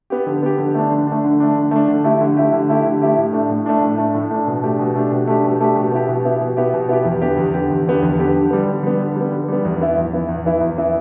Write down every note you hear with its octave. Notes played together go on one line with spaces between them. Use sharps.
B3 G4
D3
B3 G4
D3
A3 D4
D3
A3 D4
D3
A3 D4
D3
A3 D4
D3
A3 E4 G4
D3
A3 E4 G4
D3
A3 E4 G4
D3
A3 E4 G4
A2
A3 D4
A2
A3 D4
A2
A3 D4
A2
A3 D4
B2
A3 D4 G4
B2
A3 D4 G4
B2
A3 D4 G4
B2
A3 D4 G4
B2
B3 E4 G4
B2
B3 E4 G4
B2
B3 E4 G4
B2
B3 E4 G4
E2
D3 B3 G4
E2
D3 B3 G4
E2
D3 B3 G4
E2
D3 B3 G4
D3
G3 B3
D3
G3 B3
D3
G3
B3
D3
G3 B3
E2
E3 B3 E4
E2
E3 B3 E4
E2
E3 B3 E4
E2
E3 B3 E4